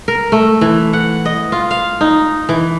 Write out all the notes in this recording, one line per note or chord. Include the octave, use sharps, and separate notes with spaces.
A#4
A3
E3
F#5
D#5
F4
F5
D#4
E3